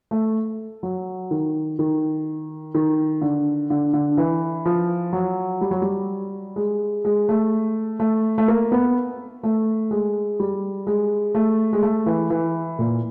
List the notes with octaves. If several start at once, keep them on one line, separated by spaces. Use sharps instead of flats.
A3
F#3
D#3
D#3
D#3
D3
D3
D3
E3
F3
F#3
G3
F#3
G3
G#3
G#3
A3
A3
A3
A#3
B3
A3
G#3
G3
G#3
A3
G#3
A3
E3
E3
A#2